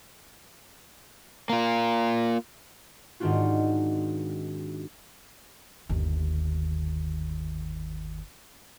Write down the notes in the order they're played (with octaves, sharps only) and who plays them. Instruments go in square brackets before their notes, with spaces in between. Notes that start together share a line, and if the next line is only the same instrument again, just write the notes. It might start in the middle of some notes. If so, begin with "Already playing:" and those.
[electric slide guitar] A#3 F4
[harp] G#2 D#3 C4 D4 F4 F#4
[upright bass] G1 D#2